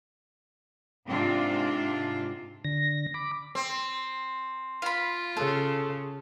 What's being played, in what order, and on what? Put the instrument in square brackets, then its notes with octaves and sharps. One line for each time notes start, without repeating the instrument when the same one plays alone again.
[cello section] G#2 C3 C4 D4 F4
[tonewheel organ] D3 A#6
B5 D6
[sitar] C4
[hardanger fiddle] F4 [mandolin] F5 B5
[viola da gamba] C#3 [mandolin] A4